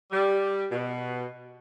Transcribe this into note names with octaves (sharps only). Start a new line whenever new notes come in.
G3
B2